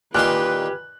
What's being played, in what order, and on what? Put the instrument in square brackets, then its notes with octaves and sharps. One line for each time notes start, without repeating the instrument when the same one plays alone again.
[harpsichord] A#2 D#3 C6 [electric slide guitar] G4 [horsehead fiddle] B4 [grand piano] G#5 F6 F#6